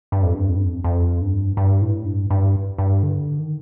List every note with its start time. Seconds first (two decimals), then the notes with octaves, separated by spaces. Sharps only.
0.12 G2
0.23 F2
0.35 G2
0.49 F2
0.56 G2
0.64 F2
0.84 F2
1.21 G2
1.57 G2
1.82 A2
2.06 G2
2.30 G2
2.78 G2
3.03 D3
3.39 D#3